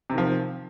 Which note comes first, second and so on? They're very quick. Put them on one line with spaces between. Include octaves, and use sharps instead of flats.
C3 D#3 F3